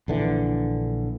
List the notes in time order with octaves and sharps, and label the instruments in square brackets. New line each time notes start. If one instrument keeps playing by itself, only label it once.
[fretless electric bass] A#1 D3 E3